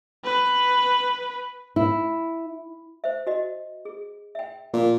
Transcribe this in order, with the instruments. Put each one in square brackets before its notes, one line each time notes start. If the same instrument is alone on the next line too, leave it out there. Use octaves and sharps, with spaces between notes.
[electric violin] B4
[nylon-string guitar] E4
[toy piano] C5 E5
F#4 D#5
G#4
E5 G5
[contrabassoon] A#2